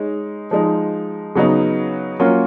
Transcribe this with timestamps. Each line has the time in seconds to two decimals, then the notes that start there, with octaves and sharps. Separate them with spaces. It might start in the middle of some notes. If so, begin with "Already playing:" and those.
Already playing: G#3 D#4 C#5
0.51 F3 G#3 D#4
1.35 C#3 F#3 B3 D#4
2.20 F#3 A#3 C#4 F4 A#4